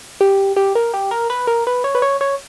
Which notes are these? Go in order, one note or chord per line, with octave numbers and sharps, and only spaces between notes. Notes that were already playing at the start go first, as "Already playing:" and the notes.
G4
G4
A#4
G4
A#4
B4
A#4
B4
C#5
B4
C#5
C#5